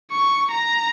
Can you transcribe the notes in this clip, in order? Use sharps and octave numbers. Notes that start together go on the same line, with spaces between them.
C#6
A#5